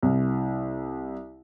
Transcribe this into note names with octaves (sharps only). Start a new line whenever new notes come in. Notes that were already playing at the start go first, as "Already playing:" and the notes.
C2